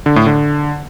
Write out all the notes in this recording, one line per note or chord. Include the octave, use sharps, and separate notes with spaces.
D3
A2
D3